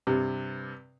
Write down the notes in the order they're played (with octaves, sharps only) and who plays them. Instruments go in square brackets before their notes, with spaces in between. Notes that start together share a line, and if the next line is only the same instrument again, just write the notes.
[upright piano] G2 C3